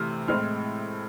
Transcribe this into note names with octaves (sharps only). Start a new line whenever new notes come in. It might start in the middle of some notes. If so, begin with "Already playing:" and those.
Already playing: C3 E3 A3 C4 F6
A2 G#3 C4 F6